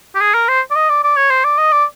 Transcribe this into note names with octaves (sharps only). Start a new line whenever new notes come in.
G4
G#4
A#4
C5
D5
D#5
D5
D5
C#5
C5
D5
D#5
D5